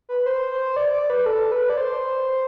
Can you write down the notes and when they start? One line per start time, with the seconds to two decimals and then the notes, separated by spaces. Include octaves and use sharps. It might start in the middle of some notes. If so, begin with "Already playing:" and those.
0.09 B4
0.26 C5
0.51 C5
0.76 D5
0.93 D5
1.10 B4
1.26 A4
1.52 B4
1.70 D5
1.77 C5